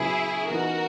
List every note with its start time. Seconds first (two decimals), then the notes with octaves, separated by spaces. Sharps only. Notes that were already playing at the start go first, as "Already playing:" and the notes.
Already playing: C#3 F#3 B3 E4 G#4
0.50 E3 B3 D#4 F#4 A#4